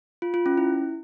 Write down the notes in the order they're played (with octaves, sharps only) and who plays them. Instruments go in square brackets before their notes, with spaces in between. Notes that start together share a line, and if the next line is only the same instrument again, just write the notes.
[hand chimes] F4
F4
C#4
E4